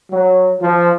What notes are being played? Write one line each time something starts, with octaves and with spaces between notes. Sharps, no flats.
F#3
F3